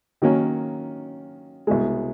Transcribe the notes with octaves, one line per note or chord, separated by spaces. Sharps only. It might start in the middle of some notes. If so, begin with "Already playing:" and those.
D#3 F#3 A#3 C#4
C2 B2 G#3